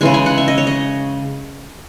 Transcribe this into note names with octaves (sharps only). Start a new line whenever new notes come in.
C#3 E3 G#3 G#5
G#5
F#5
E5
D#5
C#5
D#5